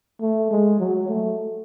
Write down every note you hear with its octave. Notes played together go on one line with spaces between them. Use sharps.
A3
G#3
F#3
A3